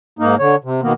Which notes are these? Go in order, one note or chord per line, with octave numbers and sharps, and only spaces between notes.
G#2 A#3 D#4
D3 C#5
C3
B2 D#3 A#3 B3